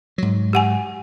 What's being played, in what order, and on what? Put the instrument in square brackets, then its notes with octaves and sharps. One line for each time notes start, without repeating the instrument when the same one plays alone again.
[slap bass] G#2 F#3
[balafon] G4 F#5 G#5